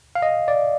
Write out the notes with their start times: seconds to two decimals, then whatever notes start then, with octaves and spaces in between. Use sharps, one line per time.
0.15 F5
0.22 D#5
0.48 D5